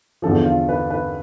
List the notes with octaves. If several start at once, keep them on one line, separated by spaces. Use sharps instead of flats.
E2 D3 F3 A4
F4
B4
B4